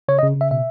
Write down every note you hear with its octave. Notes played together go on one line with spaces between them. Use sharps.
C#3 C#5
D#5
C#3
C#3 E5
B2 E5